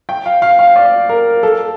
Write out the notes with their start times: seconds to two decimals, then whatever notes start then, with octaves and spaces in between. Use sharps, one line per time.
0.09 G5
0.26 F5
0.42 F5
0.59 F5
0.76 D5
1.09 A#4
1.43 A4